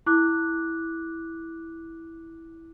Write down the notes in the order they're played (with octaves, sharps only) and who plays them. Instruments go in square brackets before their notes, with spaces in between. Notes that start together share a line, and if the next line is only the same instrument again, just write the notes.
[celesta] E4 D6 F#6